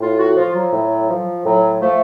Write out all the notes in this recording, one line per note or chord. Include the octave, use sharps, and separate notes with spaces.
A2 F4
F#4
F3 F4
F#3
A2
F3
A2 F#3
F3 A3